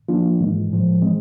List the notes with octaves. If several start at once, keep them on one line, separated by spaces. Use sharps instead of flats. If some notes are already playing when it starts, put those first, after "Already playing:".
F3 A#3 D4 F4
G#2 E3 G#3
A2 F3 G#3
E3 G#3 C4